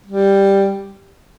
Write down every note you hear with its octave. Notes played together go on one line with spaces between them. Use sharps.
G3